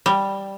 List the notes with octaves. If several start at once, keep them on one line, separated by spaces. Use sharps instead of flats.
G3